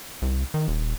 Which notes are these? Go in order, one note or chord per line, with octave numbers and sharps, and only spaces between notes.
C2
D#3
D#1